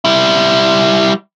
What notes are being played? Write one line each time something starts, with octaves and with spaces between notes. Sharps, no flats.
G3 E4